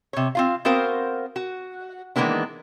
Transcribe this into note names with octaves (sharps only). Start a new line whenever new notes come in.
C3 C#5
C4 F4 F5
B3 C4 F#4 A#4 C5 F5
F#4
D#3 E3 G#3 A#3 B3 D4